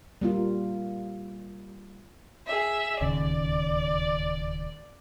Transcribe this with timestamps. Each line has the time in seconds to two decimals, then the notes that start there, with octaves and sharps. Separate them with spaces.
0.21 G3 A#3 F4
2.47 G#4 E5
3.01 D1 D#2 C#3 D5